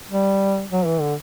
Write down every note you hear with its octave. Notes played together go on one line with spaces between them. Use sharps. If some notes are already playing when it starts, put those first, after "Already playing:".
G3
F#3
E3
D3